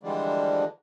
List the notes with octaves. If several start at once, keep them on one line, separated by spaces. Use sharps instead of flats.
D3 E3 F3 G3 G#3 D4